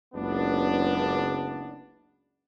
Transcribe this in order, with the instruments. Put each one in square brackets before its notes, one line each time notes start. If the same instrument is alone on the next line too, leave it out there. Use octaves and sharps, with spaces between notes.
[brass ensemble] F#1 C#2 B3 D4